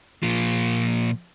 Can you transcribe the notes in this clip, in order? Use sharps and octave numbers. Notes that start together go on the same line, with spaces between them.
A#2 F3